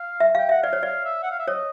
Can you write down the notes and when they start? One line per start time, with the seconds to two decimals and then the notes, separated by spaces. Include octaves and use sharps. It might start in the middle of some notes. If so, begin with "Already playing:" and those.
Already playing: F5
0.20 E5
0.35 F5 G5
0.49 E5 F#5
0.62 D5 F5
0.73 C#5
0.83 D5 F5
1.05 E5
1.23 F#5
1.31 F5
1.39 E5
1.48 C#5 D#5